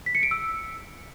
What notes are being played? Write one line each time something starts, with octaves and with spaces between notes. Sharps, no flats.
B6
C#7
D7
E6